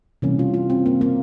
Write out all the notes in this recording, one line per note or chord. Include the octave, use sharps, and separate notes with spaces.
C3 E3 G3 A#3 C#4
F4
F4
C4
A#3
A#3